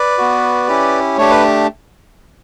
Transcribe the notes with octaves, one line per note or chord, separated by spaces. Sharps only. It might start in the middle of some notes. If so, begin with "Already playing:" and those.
Already playing: B4 D5
B3 F#4
C#4 E4 G4
A3 D4 G4 C#5
B4